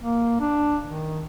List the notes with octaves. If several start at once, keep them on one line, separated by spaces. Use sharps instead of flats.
A#3
D4
D#3